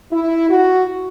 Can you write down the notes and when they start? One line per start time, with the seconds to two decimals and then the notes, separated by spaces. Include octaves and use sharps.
0.12 E4
0.50 F#4